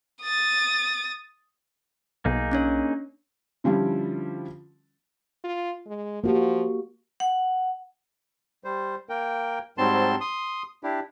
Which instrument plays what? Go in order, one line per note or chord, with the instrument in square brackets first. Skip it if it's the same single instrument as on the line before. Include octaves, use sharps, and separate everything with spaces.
[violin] D#6 A6
[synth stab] B1 [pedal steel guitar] A#3 D#4 G#4
[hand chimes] C#4 D4 C#5
[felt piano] D3 F3 G3 C#4 E4
[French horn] F4
G#3
[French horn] F3 [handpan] A#3 F#4 G4
[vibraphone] F#5
[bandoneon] G3 C5
A#3 A#4 G5
G#2 F#3 G3 C4 A5 C6
C6 D#6
D4 E4 G4